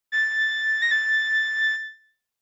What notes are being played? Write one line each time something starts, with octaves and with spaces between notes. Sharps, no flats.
A6
A#6
A6